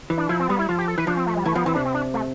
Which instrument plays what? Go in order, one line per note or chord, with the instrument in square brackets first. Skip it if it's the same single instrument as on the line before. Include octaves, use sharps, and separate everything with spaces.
[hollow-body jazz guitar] E3
[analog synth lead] D4
[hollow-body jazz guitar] F3 [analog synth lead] E4
[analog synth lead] C4
[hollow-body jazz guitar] G3 [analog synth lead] B3
[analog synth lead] E4
[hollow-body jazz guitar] F3 [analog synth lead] F4
[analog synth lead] G4
A4
[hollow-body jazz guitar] E3 [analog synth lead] B4
[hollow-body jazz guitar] F3 [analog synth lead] D4
[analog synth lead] C4
A3
G3
[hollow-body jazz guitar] E3 [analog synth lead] A3
[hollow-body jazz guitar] F3 [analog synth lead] B3
[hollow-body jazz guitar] E3 [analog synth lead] C4
[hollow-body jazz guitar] C3 [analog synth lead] D4
[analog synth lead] C4
D4
A3